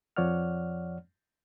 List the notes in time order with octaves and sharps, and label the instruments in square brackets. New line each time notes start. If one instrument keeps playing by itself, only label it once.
[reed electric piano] F2 F3 C#5 D5 F#5 F6